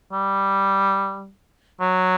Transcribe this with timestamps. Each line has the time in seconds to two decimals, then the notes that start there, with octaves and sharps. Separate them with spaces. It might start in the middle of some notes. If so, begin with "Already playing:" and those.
0.12 G3
1.81 F#3